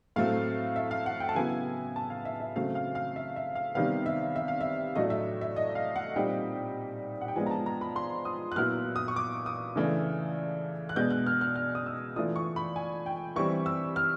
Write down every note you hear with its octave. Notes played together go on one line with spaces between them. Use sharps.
A2 F#3 A3 C4 F5
E5
F5
F#5
G5
A5
C#3 F#3 B3 E4 G#5
A5
F5
E5
E5
C#3 F#3 A3 C4 F5
F5
F5
E5
E5
F5
C3 D#3 G3 B3 F5
E5
E5
F5
E5
A2 F#3 A3 D4 D#5
E5
E5
D#5
F5
F#5
A#2 G3 C4 D#4 G5
F#5
G5
F3 G#3 B3 D4 F4 G#5
A#5
A5
A#5
B5
C6
D#6
F#6
A#2 F#3 B3 E4 F6
D#6
C#6
D6
D#6
C#3 E3 A3 D4
F#6
B2 G#3 B3 D4 G6
F#6
F6
F6
F6
D#6
E6
E3 A3 D4 F4 D#6
C#6
B5
G#5
G5
E3 G3 C4 C#6
E6
F6